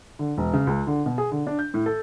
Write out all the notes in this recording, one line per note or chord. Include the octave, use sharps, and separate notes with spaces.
D3
E1
C#3
C#2
D3
B2
G#4
D3
D4
G6
A2
A4